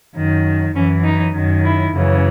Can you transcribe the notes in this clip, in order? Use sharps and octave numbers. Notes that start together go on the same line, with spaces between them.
F#2 D#3
F#2 E3 C#4
D#4
F#2 D#3
E4
F#2 C#3 E3